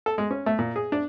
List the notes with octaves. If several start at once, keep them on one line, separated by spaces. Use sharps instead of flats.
A4
G#3
C#4
A3
A#2
G#4
D4